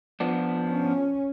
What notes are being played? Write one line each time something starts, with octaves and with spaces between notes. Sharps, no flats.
F3 B3 D4
C#4